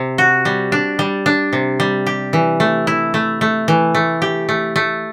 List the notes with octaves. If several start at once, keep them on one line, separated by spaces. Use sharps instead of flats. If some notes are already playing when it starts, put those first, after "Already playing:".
Already playing: C3
F#4
G3
D4
G3
D4
C3
G3
G4
E3
A3
E4
A3
A3
E3
A3
G4
A3
A3